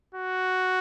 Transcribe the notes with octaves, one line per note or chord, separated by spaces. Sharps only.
F#4